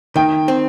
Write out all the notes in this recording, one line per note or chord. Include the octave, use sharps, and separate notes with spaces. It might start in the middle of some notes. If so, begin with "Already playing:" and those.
D#3 G5
C4